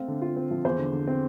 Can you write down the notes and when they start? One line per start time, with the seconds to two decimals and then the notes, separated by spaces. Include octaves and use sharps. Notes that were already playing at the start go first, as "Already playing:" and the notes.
Already playing: A3 C4 F5
0.08 D3
0.22 F4
0.36 C4
0.51 F3
0.65 E2 C5
0.79 D3
0.93 D3
1.07 C4